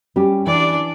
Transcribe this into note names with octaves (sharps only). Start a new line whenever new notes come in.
G3 C#4 G4
E3 D4 D5